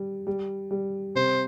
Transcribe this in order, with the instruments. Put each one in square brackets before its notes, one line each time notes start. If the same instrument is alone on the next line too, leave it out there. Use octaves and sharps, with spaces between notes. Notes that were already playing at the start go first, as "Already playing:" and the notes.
Already playing: [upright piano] G3
G3
G3
[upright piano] C3 [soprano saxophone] C5